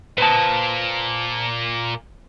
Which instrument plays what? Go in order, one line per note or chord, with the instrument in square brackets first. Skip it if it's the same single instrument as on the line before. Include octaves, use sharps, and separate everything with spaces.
[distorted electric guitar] A#2 A#3 [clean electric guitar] B4 C5 A5